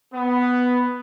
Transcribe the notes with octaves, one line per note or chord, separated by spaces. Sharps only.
B3